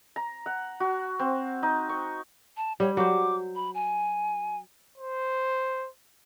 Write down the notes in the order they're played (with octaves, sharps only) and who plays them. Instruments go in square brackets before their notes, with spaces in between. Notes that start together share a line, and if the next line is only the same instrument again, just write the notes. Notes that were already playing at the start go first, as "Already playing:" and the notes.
[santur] A#5
F#5
F#4
C4
D#4
C#6
[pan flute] A5
[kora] G3 [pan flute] C#5
[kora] F#3 C5 [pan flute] D6
[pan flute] B5
G#5
[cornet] C5